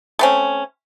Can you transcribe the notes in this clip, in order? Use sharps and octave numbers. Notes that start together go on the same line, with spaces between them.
A3 C4 C#4